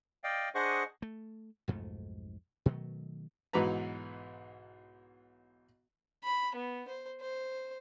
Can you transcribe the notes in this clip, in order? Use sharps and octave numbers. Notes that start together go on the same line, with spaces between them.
D5 D#5 F5 G5
D4 G#4 C5 D#5 F#5 C#6
A3
B1 F2 G#2 A3
B2 D#3 F#3 A3
B1 G#2 E3 F#3 B4 A#5
B5
B3
C5
C5